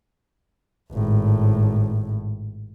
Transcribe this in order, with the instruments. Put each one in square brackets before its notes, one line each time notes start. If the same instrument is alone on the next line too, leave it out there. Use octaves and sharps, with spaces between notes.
[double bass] G#1 A2